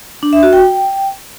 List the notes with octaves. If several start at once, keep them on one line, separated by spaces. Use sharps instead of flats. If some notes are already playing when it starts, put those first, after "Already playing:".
D4
E5
F#4
G5